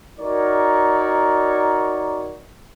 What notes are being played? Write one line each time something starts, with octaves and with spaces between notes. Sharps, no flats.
D#4 F#4 A#4 C#5 D5